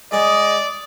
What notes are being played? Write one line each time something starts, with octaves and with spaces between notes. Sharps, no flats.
G#3 G#4 D5 D#5